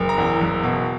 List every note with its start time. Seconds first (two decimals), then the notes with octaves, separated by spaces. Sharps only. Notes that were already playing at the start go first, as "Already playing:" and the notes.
Already playing: F#1
0.09 A#5
0.18 E2
0.41 F#1
0.63 B2